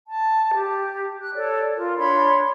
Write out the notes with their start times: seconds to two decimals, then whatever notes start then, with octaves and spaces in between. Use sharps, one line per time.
0.08 A5
0.56 G4
1.21 F#6
1.35 A4 C#5 D5
1.75 F4 A#4
1.98 D4 C#5 B5 C6